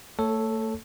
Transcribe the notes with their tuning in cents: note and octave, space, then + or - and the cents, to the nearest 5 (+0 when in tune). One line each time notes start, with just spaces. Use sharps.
A3 +35 A4 +0 C#5 +0